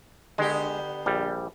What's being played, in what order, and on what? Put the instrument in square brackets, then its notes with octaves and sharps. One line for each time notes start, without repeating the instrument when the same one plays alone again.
[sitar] D3 B3 G4 [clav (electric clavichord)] G#3
[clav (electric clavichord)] A#1 G3